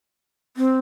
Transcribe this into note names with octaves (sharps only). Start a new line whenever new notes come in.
C4